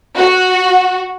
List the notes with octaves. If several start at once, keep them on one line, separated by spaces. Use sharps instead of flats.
F#4